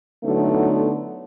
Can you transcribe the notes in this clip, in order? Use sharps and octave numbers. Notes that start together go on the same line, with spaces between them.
D3 F#3 A3 B3 D#4 E4